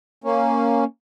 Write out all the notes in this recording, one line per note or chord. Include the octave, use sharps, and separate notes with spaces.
A#3 C#4